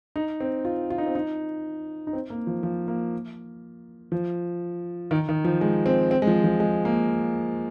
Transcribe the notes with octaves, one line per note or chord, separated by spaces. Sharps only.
D#4
C4
F4
F4
D#4
C4
D#4
D#4
C4
A#3
F3
F3
A#3
F3
D#3
D#3
F3
G#3
C4
C4
G#3
F3
F3
G#3
A#3